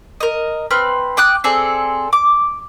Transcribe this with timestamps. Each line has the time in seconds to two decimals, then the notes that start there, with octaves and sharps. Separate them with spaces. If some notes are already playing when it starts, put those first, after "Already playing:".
0.20 A#4 D#5
0.71 C4 B4 F6
1.17 G5 D6 D#6 F#6
1.44 C4 G#4 A4 D5
2.13 D6